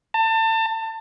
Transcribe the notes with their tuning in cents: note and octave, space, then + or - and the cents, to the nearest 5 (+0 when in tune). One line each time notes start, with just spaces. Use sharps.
A5 +30